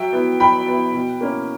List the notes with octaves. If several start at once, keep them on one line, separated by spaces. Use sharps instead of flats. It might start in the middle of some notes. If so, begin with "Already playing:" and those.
Already playing: F#3 E5 G5
B3 E4
F#3 G5 B5
B3 E4
B2
A#3 C#4 E4